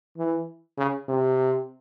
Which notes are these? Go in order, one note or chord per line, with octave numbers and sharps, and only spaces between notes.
E3
C#3
C3